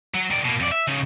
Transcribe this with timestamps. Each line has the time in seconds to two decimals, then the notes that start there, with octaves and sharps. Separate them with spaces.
0.15 F#3
0.30 D#3 D5
0.45 B2 A#3
0.60 F2 D5
0.72 E5
0.88 C#3 D#4